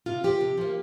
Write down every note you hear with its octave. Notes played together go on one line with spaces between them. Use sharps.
C3 F4
F3 A#3 G4
C3
F3 A#3